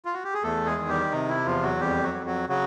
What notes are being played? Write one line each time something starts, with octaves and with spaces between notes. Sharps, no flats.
F4
F#4
G4
G#4
E2 A3 A4
G#3 G#4
D#3
G3 G4
C3 D#4
E4
E2 F3 F4
F#3 F#4
F2 G3 G4
F#3 F#4
F#3
F#3 F#4
C#3 F#3 F#4